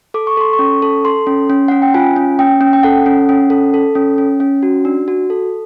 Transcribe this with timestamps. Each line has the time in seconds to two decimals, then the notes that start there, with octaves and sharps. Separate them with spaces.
0.14 A4 D6
0.27 C#6
0.37 A4 C6
0.53 C#6
0.59 C#4
0.82 A4
1.05 A4 C6
1.27 C#4
1.50 C#4
1.68 C#4 F#5
1.82 G5
1.94 F4 G#5
2.16 C#4
2.39 C#4 G5
2.61 C#4
2.73 G5
2.83 A4 F#5
3.06 C#4
3.29 C#4
3.50 A4
3.74 A4
3.95 C#4
4.18 C#4
4.40 C#4
4.63 F#4
4.85 D4
5.08 F#4
5.30 A4